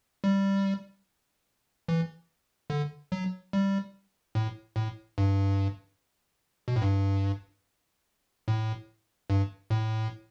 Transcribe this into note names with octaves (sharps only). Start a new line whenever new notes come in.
G3
E3
D3
F#3
G3
A2
A2
G2
B2
A2
G2
A2
G2
A2